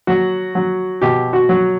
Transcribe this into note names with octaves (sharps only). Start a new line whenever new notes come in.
F#3 F#4
F#3
B2 G4
F#4
F#3